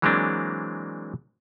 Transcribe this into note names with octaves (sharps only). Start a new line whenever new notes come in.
E3 F#3 G#3 A#3 C4 D4